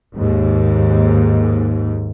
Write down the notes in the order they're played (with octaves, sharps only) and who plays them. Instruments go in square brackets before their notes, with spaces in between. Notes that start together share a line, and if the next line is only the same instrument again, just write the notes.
[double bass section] D#2 G#2